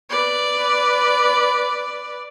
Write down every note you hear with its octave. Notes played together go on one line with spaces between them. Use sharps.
B4 D5